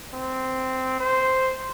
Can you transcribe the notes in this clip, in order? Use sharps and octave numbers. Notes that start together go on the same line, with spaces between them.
C4
C5